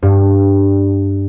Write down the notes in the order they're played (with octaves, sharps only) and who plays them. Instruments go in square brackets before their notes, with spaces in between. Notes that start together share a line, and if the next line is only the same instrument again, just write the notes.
[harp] G2